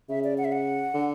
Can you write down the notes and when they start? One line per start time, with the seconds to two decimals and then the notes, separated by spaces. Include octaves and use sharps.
0.10 C#3 E5
0.24 D5
0.38 F#5
0.45 E5
0.52 F#5
0.94 D3